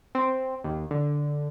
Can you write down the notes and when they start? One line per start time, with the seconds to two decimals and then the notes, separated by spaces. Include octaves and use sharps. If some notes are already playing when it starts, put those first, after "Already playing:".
0.15 C4
0.64 D#2
0.91 D3